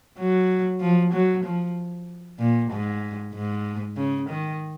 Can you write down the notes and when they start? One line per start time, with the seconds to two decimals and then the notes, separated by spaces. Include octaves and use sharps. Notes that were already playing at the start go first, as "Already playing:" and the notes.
0.18 F#3
0.81 F3
1.13 F#3
1.44 F3
2.39 A#2
2.71 G#2
3.34 G#2
3.97 C#3
4.29 D#3